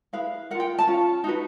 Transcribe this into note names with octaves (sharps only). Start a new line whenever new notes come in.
E4 G#4 B4 F5
F4 A#4 F#5
G5
A5
C#4 F4
D#4 F#4 B4